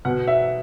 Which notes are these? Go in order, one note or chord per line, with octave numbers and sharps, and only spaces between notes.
B2 F#5
E5